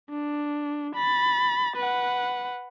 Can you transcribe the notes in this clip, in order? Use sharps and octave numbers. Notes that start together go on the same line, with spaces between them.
D4
B5 A6
B4 F#5